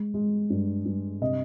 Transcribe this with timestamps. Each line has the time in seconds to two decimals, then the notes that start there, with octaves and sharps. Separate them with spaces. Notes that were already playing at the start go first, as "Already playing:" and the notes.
Already playing: G#3
0.14 G#3
0.50 G2
0.86 G2
1.21 C3 D#5